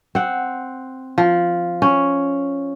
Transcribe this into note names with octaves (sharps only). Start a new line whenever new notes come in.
C4 F#5
F3
C#4